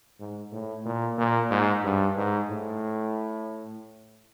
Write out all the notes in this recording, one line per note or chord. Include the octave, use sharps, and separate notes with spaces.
G#2
A2
A#2
A#2
G#2
G2
G#2
A2